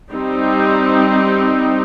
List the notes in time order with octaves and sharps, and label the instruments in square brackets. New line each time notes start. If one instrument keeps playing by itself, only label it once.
[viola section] G3 C4 D#4